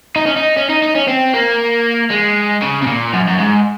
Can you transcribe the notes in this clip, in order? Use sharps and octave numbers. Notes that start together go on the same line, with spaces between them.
D#4
C#4
D#4
C#4
D#4
D#4
C#4
C4
A#3
G#3
C#3
C3
A#2
F#2
F#2
G#2